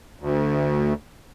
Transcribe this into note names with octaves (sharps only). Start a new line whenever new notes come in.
D2